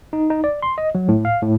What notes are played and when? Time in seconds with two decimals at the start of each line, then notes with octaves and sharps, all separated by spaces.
0.13 D#4
0.30 D#4
0.44 D5
0.62 C6
0.78 D#5
0.95 F#3
1.08 A2
1.25 F5
1.43 A2